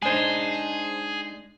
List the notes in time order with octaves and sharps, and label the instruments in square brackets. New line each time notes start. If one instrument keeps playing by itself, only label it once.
[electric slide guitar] G#3 D4 D#4 [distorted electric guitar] G#4 [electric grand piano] C5 G#5